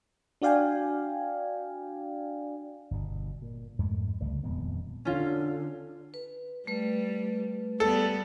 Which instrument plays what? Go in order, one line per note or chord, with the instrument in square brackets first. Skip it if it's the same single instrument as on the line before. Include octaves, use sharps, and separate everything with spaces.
[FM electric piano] D4 F#4 D5 F5 G5 G#5
[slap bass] G1 B2
A#2
F2 G#2 G#3 A3
C#2 D3 G3 A3
D#1 F2 G#3 B3
[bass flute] D3 [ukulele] C#4 F4
[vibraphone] B4
[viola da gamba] G3 [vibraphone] A3 B4
[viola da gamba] G3 B3 [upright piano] A4